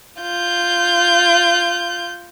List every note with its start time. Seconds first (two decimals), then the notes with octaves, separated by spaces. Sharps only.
0.22 F4 G6